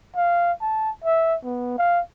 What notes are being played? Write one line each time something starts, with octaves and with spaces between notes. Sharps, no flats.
F5
A5
E5
B3
F5